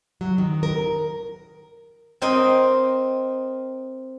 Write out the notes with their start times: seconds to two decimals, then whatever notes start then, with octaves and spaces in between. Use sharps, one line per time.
0.21 F#3
0.38 D#3
0.63 A#4
2.22 C4 A#4 D#5 G5